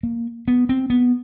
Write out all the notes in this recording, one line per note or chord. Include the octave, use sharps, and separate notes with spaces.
A#3
B3
C4
B3